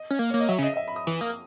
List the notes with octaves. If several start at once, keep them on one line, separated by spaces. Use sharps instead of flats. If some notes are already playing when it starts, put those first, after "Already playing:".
Already playing: D#5
C#4
A#3
A#3 C#5
D#5
F#3 E5
C#3
D#5
D#5
E5
B5
D#6
E3
A#3 D#6